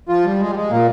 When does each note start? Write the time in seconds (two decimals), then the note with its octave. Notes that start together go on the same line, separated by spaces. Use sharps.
0.09 F3 F4
0.25 G3
0.39 G#3
0.50 G3
0.55 G#3
0.70 A#2 A#3